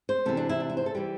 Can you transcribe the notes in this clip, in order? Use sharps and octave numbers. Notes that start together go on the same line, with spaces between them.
C5
C3 E3 C4 A4
D4
E4
D4
E4
C5
A4
E3 G3 G4